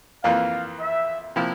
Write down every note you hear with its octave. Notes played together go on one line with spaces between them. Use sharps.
F2 E3 A#3 F4 F5
E5
C3 F3 A#3 E4